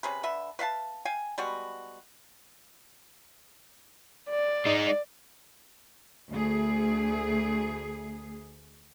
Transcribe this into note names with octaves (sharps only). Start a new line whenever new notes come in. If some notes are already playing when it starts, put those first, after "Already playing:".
C3 C#4 G#4 B4
D3 B4 E5
B4 E5 F5 A5
F5 G5 G#5
G3 G#3 B3 F#4
D5
G#3 D#4
D2 A3 G#4